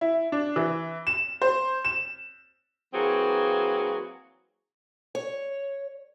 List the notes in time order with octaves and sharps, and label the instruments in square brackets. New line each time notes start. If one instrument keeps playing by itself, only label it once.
[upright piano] E4
D4
E3
E7
C5
E7
[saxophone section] E3 F#3 A#3 C4 F#4 G#4
[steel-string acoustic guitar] C#5